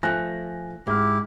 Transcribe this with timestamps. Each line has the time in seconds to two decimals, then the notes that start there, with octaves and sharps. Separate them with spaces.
0.03 F3 A3 G#5 F#6 A#6
0.87 G#2 E4 G4 G#4 F6